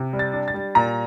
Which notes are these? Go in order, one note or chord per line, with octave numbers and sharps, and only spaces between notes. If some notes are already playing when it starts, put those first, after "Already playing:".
Already playing: C3
G3
A6
D4
A6
G3
A#2 A#5